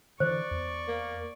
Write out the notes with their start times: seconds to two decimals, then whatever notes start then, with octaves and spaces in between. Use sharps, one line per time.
0.20 D3 E3 C5 D5 C#6
0.51 E2
0.88 A#3